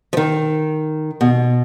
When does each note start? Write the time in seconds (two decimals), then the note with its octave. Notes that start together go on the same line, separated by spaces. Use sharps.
0.13 F3
0.17 D#3
1.21 B2